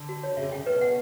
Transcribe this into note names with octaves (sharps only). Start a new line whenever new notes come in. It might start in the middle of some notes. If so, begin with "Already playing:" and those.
Already playing: D3
F#4
C#5
C#3 E5
D3
C#3 G5
B2 B4
F#5